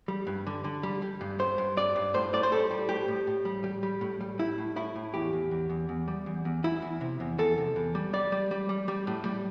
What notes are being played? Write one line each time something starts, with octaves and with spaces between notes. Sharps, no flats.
G3
G2
D3
D3
G3
G3
G2
G2 C5
G2
G2 D5
G2
A2 C5
A2 D5
C5
G3 A4
G3
A2 G4
A2
A2
G3
G3
G3
A2
G3
G3 E4
A2
A2 E4
A2
E2 G4
E2
E2
E2
E2
G3
E2
E2
E2 E4
E2
C3
E2
E2 A4
C3
E2
G3
G3 D5
G3
G3
G3
G3
A2
G3